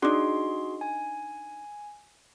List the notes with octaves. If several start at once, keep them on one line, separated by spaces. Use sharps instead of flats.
D4 D#4 F#4 G#4 C6
G#5